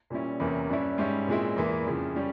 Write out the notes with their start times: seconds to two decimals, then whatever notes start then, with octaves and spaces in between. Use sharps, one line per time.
0.10 A#2 G3 C#4 E4
0.40 E2 C3 E3 A#3 C#4
0.69 G2 G3 C#4 E4
0.98 G#2 G3 C#4 E4
1.28 A#2 G#3 C4 E4
1.56 E2 E3 A#3
1.86 F2 C#3 F3
2.16 G3 C#4